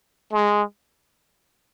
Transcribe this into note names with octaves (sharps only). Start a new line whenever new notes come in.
G#3